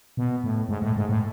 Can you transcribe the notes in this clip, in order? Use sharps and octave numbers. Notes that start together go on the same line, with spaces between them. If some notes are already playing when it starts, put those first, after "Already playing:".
B2
A2
G#2
A2
G#2
A2